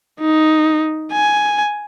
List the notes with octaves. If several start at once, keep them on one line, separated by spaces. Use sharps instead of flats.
D#4
G#5